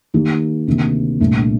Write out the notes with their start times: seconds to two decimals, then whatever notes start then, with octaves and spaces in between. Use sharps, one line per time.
0.14 D#3 A#3 D#4 G4
0.67 D2 C3 D#3 A#3
1.20 C2 A#2 A3 D4